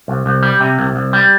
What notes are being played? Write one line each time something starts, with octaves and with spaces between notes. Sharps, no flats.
C2
C2
G3
C3
C2
C2
G3